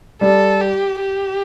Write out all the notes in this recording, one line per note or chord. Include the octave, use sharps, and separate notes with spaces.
G3 A4
G4
G4